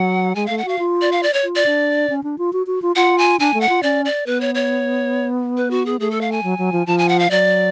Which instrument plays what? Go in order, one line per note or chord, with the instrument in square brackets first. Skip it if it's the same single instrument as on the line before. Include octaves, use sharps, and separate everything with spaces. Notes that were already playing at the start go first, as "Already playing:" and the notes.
Already playing: [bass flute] F#3 [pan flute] F#5
[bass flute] G#3 [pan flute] G#5
[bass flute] A3 [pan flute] F5
[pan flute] F#5
[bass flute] F#4 [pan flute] F5
[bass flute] F4
[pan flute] D5
F5
D5
C#5
[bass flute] F4
[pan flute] D5
[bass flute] D4
C#4
D4
F4
F#4
F#4
F4
[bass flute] F4 [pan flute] F#5
[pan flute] G#5
[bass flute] D4 [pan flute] G#5
[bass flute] A3
[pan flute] F#5
[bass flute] F4
[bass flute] C#4 [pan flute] D5
[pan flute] D5
[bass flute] B3 [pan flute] B4
[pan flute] C#5
C#5
B4
F#4
G#4
[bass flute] A3 [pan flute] G#4
[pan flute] A4
F5
G#5
[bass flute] F#3
F#3
F3
[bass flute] F3 [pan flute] A5
[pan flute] G#5
F#5
F5
[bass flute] F#3 [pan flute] D5